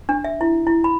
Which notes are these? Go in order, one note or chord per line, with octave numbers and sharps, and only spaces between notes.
D4
E5
E4
E4
B5